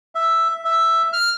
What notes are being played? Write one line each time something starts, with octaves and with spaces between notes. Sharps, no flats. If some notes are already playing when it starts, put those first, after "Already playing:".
E5
E5
F6